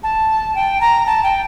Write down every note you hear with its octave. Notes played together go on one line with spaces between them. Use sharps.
A5
G5
A#5
A5
G5